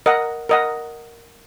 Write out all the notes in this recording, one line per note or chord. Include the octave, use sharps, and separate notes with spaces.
A#4 D#5 F#5
A#4 D#5 F#5